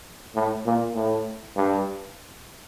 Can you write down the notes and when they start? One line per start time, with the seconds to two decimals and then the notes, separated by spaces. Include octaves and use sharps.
0.35 A2
0.66 A#2
0.95 A2
1.56 G2